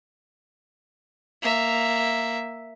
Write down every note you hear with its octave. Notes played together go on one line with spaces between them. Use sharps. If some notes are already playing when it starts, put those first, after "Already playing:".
A#3 E5